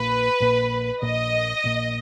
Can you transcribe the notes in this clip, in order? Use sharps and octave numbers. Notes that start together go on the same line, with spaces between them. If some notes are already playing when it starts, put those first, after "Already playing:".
Already playing: A#1 A#2 A#3 B4
A#1 A#2 A#3
A#1 A#2 A#3 D#5
A#1 A#2 A#3